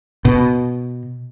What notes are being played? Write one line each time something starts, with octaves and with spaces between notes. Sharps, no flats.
B2